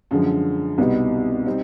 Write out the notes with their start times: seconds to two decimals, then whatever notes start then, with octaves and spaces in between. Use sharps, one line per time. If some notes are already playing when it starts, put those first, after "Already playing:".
0.11 F#2 D3 F3 G#3
0.78 C2 B2 G3 B3 D#4
1.46 G3 C4 D#4